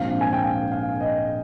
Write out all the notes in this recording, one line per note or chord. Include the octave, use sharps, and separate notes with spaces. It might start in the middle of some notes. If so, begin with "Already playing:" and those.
Already playing: A#1 G#2 F3 C4 F5
G#5
G5
F5
F5
D#5